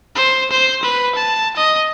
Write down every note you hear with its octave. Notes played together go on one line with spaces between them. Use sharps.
C5
C5
B4
A5
D#5